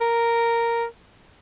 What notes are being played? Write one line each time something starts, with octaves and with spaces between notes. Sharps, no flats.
A#4